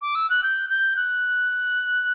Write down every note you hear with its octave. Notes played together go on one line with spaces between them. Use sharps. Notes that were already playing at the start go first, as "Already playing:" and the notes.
D6
E6
F#6
G6
G6
F#6